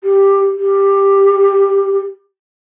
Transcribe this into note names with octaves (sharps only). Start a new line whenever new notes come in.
G4
G4